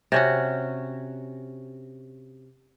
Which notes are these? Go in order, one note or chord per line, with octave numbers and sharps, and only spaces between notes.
C3 C#4 F#4